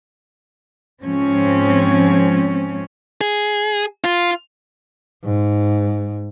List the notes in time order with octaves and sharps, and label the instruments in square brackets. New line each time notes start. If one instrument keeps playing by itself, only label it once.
[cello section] G#2 F3 C4 C#4
[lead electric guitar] G#4
F4
[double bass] G#2